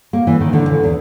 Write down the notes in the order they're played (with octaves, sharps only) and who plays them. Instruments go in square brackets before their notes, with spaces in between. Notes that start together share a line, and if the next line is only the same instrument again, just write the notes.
[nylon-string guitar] A#3
E3
D#3
D3
E3
E2